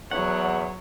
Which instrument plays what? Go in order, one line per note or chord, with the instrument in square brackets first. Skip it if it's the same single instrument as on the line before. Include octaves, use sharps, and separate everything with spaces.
[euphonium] E2 [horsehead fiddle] F#3 C#5 [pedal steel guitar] F#5